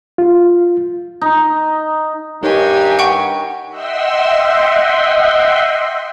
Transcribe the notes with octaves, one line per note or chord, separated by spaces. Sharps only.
F4
D#4
G2 D#4 G4 A#4 C#5 G#5
F#5 G5 C#6
D#5 E5 F#5 G5 C6 E6